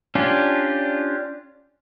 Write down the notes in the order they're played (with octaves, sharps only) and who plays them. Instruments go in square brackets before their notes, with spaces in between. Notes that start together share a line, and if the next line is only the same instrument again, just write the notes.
[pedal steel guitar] C#4 D4 F4 G4